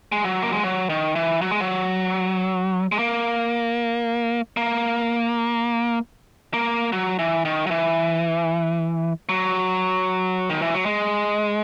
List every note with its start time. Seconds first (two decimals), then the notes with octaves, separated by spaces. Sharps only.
0.12 G#3
0.24 F#3
0.42 A#3
0.53 G#3
0.63 F#3
0.90 D#3
1.15 E3
1.41 F#3
1.51 G#3
1.60 F#3
2.92 G#3
2.99 A#3
4.57 A#3
6.54 A#3
6.92 F#3
7.19 E3
7.45 D#3
7.67 F#3
7.71 E3
9.29 F#3
10.50 D#3
10.62 E3
10.74 F#3
10.86 G#3